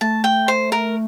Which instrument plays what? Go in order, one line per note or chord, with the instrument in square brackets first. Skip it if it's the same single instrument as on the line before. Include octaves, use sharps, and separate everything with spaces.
[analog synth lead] A3 [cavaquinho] A5
[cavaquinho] G5
C5
A#4